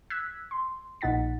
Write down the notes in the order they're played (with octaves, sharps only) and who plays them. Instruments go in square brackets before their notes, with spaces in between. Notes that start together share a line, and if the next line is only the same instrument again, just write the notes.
[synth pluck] E6 F#6 G#6 B6
C6
A#1 A#2 D#4 F#5 A6 B6